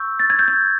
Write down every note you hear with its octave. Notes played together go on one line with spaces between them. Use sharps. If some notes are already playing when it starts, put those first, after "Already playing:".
Already playing: C#6 E6 G6
A6
G#6
G6
G#6